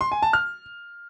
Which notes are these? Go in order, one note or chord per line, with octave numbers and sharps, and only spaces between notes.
C6
G#5
A5
F6